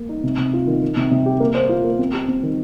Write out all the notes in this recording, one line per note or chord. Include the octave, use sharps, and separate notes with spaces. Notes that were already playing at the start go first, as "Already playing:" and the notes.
Already playing: A#3
D#4
C3
C3
F4
D#3
D#3
C3
C3
G4
A#3
C5
F4
A#3
C4
G4
C4
D#3